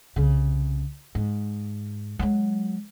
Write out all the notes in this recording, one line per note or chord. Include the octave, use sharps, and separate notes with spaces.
C2 C#3
G#2
F#3 G#3